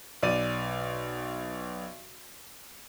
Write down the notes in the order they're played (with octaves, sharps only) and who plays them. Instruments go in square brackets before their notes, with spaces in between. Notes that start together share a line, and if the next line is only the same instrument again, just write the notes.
[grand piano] B1 D5 D#7